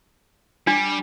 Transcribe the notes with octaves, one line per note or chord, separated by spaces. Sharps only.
G3 D4